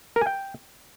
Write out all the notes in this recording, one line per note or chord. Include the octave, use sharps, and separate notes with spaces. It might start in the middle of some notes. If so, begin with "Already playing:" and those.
A#4
G#5
G5